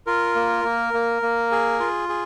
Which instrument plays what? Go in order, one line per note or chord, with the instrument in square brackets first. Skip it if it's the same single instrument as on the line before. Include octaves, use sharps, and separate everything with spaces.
[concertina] F4 A#4
A#3
A#3
A#3
A#3
G#4
F4
G#4